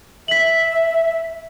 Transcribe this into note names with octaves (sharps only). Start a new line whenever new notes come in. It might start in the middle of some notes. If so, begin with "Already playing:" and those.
E5 B6 F#7